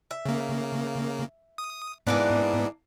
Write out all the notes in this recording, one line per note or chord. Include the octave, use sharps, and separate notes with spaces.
E5
C#3 A#3
D#6
G#2 E3 A#3 B3 D4